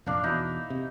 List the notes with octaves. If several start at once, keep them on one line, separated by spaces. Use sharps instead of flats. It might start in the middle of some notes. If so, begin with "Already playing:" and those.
F1 A#1 A#3 D4
E2 B2 D#4 E4
C3